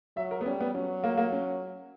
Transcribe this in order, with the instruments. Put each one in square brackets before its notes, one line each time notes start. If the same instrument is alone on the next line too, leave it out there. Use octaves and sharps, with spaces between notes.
[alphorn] F#3 [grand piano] E5
[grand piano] A#4
B3
[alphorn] G3 [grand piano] C#4
[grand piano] B3
[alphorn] F#3 [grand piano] C#4
[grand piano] A#3
A#3
C#4